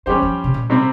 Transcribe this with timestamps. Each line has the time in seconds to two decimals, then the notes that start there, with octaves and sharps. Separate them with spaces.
0.06 F3 G3 C#4 G4 C5
0.23 F3
0.44 C3
0.54 A#2
0.70 C3 G3 C4